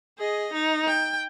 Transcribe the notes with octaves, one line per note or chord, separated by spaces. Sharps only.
G#4 D#5
D#4
G5